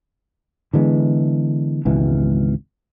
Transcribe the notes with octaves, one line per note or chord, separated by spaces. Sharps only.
D3 E3 G#3 B3
G#1 C#2 B2 E3